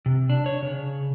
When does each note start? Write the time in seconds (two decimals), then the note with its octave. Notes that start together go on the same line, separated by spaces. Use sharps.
0.06 C3
0.30 D4
0.46 C#5
0.62 C#3